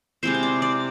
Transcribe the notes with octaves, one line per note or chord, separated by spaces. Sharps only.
C3 G#3 C4 E4 C5
C5
D5
D5